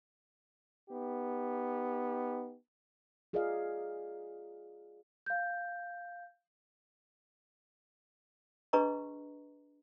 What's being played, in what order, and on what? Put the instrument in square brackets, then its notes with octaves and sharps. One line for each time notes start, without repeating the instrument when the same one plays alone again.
[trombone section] B3 D#4 G4
[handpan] F4 G#4 A#4 D5 D#5 F5
[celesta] F5 G6
[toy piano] D4 G#4 B4 D#5 A#5 C#6